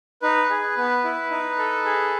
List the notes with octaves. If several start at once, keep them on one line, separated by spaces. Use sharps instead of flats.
D#4 B4
G#4
B3
E4
D#4
A4
G#4